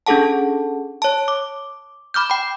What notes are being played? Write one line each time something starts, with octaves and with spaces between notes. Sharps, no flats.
C#4 D4 G#4 A4 F#5 A5
C#5 A5
D6
B5 D6 F6 G6
G5 B5